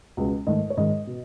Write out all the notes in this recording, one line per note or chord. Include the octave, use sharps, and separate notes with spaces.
C#2 B2 G#3 B3
G#2 D#3 A3 D#5
C#5
G#2 D#3 G#3 D#5
B2